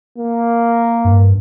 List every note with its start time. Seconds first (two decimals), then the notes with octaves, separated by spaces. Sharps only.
0.18 A#3
1.05 G2